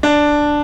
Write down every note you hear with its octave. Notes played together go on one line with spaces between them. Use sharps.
D4